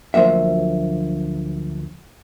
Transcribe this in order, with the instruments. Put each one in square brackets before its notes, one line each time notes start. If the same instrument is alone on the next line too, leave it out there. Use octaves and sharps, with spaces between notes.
[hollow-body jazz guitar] D2 F3 F#3 A#3 E5